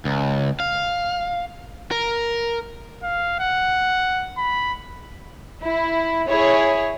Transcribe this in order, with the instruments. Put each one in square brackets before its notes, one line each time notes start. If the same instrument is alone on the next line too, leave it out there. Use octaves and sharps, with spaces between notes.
[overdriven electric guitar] C#2
F5
A#4
[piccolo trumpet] F5
F#5
B5
[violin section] E4
E4 G#4 C#5